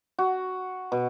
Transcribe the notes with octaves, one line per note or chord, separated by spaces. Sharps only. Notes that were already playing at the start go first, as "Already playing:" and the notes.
F#4
B2